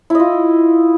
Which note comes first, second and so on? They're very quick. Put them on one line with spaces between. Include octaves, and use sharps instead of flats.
E4 D#5 F4